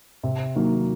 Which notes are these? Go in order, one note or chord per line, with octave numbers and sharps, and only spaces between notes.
C3
D#3 F#3 A#3